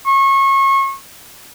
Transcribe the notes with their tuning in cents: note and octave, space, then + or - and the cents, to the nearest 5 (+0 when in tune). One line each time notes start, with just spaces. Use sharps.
C#6 -30